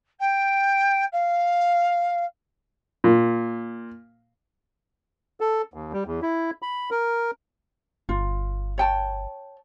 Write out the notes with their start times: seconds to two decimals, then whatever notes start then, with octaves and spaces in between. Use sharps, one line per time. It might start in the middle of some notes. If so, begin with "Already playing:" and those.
0.19 G5
1.12 F5
3.04 A#2
5.40 A4
5.74 D#2
5.93 G3
6.06 E2
6.22 E4
6.62 B5
6.91 A#4
8.09 G1 F4
8.78 C#5 G5 A5